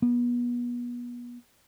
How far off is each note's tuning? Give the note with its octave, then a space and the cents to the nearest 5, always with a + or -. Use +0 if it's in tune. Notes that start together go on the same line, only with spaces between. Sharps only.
B3 -30